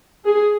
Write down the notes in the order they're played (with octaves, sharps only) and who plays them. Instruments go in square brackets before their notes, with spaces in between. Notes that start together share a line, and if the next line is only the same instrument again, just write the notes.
[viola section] G#4